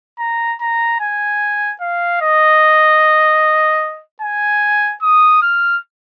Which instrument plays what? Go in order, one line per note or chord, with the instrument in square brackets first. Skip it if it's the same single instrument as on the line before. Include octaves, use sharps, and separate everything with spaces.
[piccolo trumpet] A#5
A#5
G#5
F5
D#5
G#5
D#6
F6